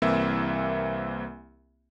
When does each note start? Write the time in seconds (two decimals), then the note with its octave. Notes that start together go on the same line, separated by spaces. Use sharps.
0.02 C2 E3 A#3 C4 E5 E6